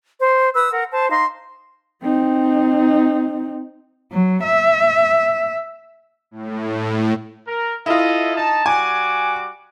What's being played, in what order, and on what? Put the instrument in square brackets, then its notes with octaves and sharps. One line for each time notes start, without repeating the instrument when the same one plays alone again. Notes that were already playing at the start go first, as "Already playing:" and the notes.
[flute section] C5
B4 D#6 E6
A#4 F#5
C5 A5
D#4 F5 C6
[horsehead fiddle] C4 D#4
[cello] F#3
E5
[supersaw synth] A2
[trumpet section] A#4
[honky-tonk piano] E4 F4 [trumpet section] A4 D#5
[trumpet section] D#4 A5
[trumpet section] G3 F#4 D6 [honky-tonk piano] G#5